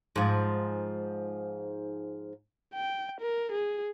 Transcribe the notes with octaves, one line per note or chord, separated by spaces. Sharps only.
G#2 F3
G5
A#4
G#4